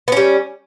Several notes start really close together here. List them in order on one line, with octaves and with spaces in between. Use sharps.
B3 C#4 G3